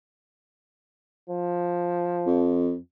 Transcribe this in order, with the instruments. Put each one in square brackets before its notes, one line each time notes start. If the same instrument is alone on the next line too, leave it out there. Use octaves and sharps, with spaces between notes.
[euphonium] F3
[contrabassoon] F2